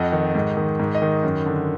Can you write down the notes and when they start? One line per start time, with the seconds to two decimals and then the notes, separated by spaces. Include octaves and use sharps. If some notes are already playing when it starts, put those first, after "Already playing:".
Already playing: F2 D#5 F#5
0.12 D#3
0.35 G#2
0.57 D#3
0.80 G#2
0.95 D#5
1.02 D#3
1.23 F#2
1.46 D3